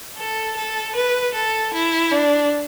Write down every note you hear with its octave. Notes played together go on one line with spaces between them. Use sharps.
A4
A4
B4
A4
E4
D4